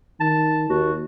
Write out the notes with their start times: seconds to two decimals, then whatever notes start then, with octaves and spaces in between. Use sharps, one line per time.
0.20 D#3 A5
0.69 D#2 F#4